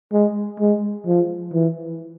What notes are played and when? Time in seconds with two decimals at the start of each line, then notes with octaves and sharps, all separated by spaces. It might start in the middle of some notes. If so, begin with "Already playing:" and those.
0.13 G#3
0.60 G#3
1.07 F3
1.53 E3